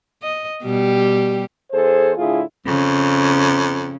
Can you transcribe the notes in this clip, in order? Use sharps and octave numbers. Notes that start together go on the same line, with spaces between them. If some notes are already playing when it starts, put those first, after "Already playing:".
D#5
B2 G3 G4
E2 G#4 A4 C5
A2 D3 E4 F4 G#4
F2 C#3